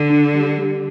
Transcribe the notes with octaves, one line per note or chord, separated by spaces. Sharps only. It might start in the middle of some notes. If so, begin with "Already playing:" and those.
Already playing: D3
D4
G3
G3